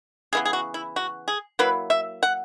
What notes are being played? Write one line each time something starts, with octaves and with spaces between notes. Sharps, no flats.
C#3 E3 B3 G#4
G#4
F#4
E4
F#4
G#4
F#3 A#3 E4 B4
E5
F#5